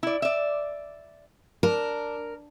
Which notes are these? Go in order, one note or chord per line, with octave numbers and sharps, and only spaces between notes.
E4 D5
D5 E5
D4 A#4